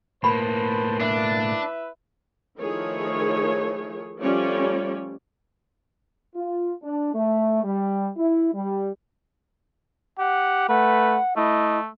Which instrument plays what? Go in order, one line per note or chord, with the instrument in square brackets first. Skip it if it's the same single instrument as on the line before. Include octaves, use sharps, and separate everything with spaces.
[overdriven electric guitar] A2 A#3 [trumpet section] B4 C5 A5 [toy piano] B5
[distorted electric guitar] D4 [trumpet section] E4 B4 E5
[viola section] D#3 F3 A3 E4 G#4 C#5
F3 G3 A3 C#4 C#5 D5
[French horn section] F4
D4
A3
G3
E4
G3
[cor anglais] G4 [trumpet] F#5
[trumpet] A3 [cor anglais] B4 [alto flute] F#5
[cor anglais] A3 [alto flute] E4 [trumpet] D#5